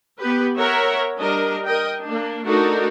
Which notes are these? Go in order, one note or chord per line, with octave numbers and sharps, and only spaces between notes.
B3 G4 B4
A#4 C#5 E5 F#5 A#5
G3 D4 A#4 D#5
A#4 D#5 G5
A#3 D4
A3 D4 D#4 F#4 A#4